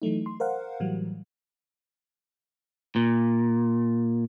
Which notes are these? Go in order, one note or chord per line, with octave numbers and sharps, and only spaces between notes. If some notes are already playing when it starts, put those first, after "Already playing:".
E3 F#3 A3 D#4
C6
A#4 C5 F5 F#5
A2 E3 F#3 G3
A#2